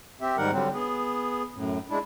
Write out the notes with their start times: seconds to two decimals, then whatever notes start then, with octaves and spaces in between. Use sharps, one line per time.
0.21 C4 G4 E5
0.37 G#2 D#3 G3 A#4 F#5
0.52 D3 F#3 G3 C4
0.73 B3 G#4
1.55 F#2 A2
1.90 G#3 D4 E4